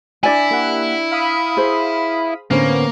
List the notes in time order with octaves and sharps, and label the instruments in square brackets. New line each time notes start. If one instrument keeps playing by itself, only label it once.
[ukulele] D4 D5 G#5 [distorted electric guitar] E4
[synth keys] A#3 G4 F#5
F5 B5 D#6
[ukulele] G#4 C5
[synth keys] A2 D3 B3 [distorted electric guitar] A#3 [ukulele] C#4 C5